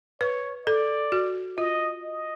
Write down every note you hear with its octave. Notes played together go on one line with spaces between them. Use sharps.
B4 C#5
A4 D5
F#4
F4 D#5
D#5